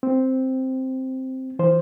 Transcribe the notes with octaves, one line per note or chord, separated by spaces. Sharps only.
C4
E3 C5